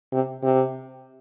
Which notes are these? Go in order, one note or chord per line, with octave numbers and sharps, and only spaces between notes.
C3
C3